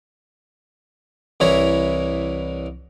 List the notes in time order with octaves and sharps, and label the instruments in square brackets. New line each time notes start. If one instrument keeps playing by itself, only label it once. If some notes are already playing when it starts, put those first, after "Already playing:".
[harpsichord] C2 E3 E4 C#5 A#5